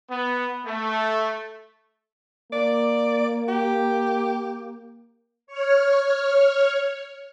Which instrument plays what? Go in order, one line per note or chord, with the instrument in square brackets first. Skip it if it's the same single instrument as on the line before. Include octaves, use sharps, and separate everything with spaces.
[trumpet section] B3
A3
[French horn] A#3 [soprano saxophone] D5
[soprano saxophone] G4
[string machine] C#5 F6